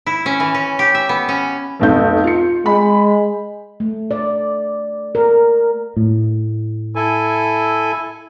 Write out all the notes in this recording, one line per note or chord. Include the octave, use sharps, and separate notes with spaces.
E4
C#4
E3
C#4
G4
E5
B3
C#4
F1 B1 G6
F4 C#7
G#3 B5
A3
D5
A#4
A2
E4 A4 G#5